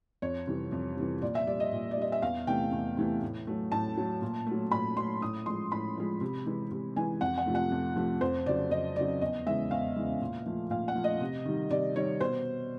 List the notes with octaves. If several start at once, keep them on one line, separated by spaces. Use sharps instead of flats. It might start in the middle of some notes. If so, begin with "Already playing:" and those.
F2 C#5
C3 E3 G3
F2
C3 E3 G3
A#2 D5
E5
G3 D5
D#5
A#2
D5
G3 D#5
E5
E2 F5
C3 E3 A3 G5
E2
C3 E3 A3
A2
F#3 A3
A2 A5
F#3 A3
A#2
A3
F#3
A#2 B5
F#3 A3 C6
A2 D#6
F3 G#3 C6
A2 B5
F3 G#3
C3
E3 G#3
C3
E3 G#3 G#5
F2 F#5
F#5
C3 F3 A3
F#5
F2
C3 F3 A3
F2 C5
C#3 F#3 D5
F2 D#5
C#3 F#3 D5
E2 D#5
C#3 E3 G#3 E5
E2 F5
C#3 E3 G#3
A#2
F3 A3
A#2 F5
F#5
F3 A3
D#5
C3
D#3 G3
C3 D5
D#3 G3 C#5
B2 C5